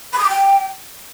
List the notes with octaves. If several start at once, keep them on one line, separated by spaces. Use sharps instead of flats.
B5
D#6
D6
G5